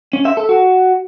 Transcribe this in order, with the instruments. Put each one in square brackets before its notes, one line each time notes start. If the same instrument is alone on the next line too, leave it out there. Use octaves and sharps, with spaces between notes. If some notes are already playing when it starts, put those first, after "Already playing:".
[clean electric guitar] C#4
E5
A4
F#4